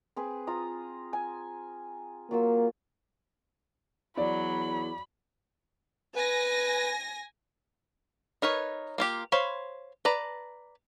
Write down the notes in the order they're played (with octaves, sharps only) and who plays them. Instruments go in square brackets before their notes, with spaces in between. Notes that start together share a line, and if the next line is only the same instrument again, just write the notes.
[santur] C4 G#4 B4
F4 A#5 D#6
G#5
[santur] F#3 F4 E6 [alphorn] A#3
[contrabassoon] E2 [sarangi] F#3 [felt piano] D5 [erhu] B5
[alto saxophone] B4 [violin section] G#5 A#6
[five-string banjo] D#4 A#4 B4 C#5
A#3 F4 G4
C5 C#5 F5 B5
B4 D5 A5 A#5